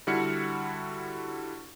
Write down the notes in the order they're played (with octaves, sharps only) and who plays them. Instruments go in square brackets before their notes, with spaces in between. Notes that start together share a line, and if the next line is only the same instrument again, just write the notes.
[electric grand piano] D3 G3 E4 F#4 F6 C#7